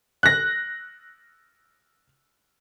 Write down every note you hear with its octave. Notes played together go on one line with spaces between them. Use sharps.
F#6 A#6